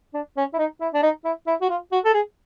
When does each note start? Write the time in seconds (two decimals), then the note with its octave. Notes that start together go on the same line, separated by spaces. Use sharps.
0.14 D4
0.37 C#4
0.53 E4
0.58 D#4
0.81 E4
0.93 D4
1.03 D#4
1.25 E4
1.47 E4
1.62 F#4
1.70 F4
1.92 F#4
2.05 A4
2.14 G#4